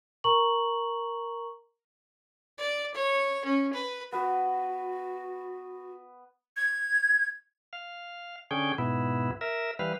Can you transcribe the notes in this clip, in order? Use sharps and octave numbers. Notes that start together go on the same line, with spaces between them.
A#4 A#5 C#6 F#7
D5
C#5
C#4
B4
B3 F#4 B4
G#6
F5
D3 C#4 G#4 G5
G#2 B2 B3 E4
A#4 E5
E3 G3 B4 F5